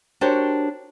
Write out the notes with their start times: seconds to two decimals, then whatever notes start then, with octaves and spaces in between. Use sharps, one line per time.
0.21 D4 F#4 G4 A#4 C5 C#5